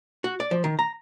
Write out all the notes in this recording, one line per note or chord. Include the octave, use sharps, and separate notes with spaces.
F#4
D5
F3
D#3
A#5